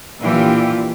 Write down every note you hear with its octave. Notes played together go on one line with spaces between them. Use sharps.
A#2 E3 D4 F4 G4